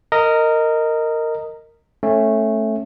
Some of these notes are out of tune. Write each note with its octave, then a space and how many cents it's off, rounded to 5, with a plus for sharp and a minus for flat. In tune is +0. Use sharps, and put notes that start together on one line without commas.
A#4 -15 D#5 +0
A3 +0 C#4 -20